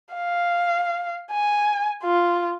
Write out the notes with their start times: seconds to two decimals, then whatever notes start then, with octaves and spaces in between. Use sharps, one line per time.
0.15 F5
1.32 G#5
2.04 F4